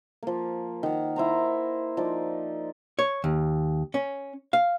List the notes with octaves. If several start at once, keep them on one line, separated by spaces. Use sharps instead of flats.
F3 A#3
D#3 F#5
E4 C5 A#5
F3 D#4 D5
C#5
D#2
C#4
F5